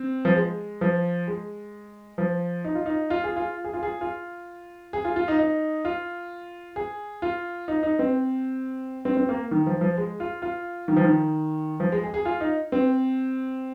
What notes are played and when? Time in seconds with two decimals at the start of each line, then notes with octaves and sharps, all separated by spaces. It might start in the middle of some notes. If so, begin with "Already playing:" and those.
Already playing: C4
0.25 F3
0.36 G#3
0.81 F3
1.27 G#3
2.18 F3
2.64 D#4
2.75 F4
2.86 D#4
3.10 F4
3.24 G#4
3.36 F4
3.64 G#4
3.73 F4
3.83 G#4
4.01 F4
4.93 G#4
5.05 F4
5.16 F4
5.28 D#4
5.39 D#4
5.85 F4
6.76 G#4
7.22 F4
7.68 D#4
7.83 D#4
7.99 C4
9.05 C4
9.17 C4
9.29 A#3
9.51 D#3
9.67 F3
9.81 F3
9.98 G#3
10.20 F4
10.42 F4
10.88 D#3
10.96 F3
11.04 D#3
11.80 F3
11.92 G#3
12.04 G#4
12.14 G#4
12.25 F4
12.41 D#4
12.72 C4